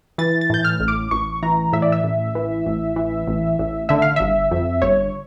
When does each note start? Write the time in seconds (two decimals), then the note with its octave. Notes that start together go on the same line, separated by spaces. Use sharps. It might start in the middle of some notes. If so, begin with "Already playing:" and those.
0.18 E3 A6
0.41 A6
0.50 A2 G6
0.65 F6
0.80 A1
0.88 D6
1.11 A1 C#6
1.43 E3 A#5
1.73 A2 E5
1.82 D5
1.92 E5
2.04 A1
2.35 E3
2.66 A1
2.96 E3
3.27 A1
3.59 A1
3.89 D3 E5
4.02 F5
4.16 G1 E5
4.51 F2
4.82 G1 C#5